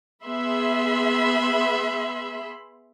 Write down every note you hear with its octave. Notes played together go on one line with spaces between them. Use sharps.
B3 G#4 E5 B5 C6